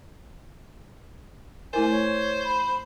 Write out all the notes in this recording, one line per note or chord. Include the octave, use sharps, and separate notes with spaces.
A3 E4 A#4 C5 G#5
C#5
B5